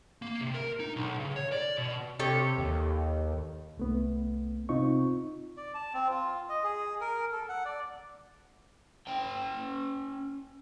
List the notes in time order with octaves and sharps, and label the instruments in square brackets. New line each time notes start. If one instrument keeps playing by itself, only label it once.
[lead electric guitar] A#3
C3
A#4
D#4
B1
C#3
C#5
D5
B2
[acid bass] C3 [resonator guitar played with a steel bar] G4 A4 C#5
[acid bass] D#2
[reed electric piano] C2 A3 B3
C3 C4 D#4 F4 C#6
[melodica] D5
A5
C4
F4
D#5
G#4
A#4
A4
F#5
D5
[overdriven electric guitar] C#4 G5